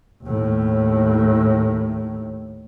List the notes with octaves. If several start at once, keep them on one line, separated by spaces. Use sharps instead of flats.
D#2 A2